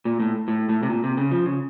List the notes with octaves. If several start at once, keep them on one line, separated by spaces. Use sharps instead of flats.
A#2
A2
A2
A2
C3
A#2
C3
C#3
F3
C#3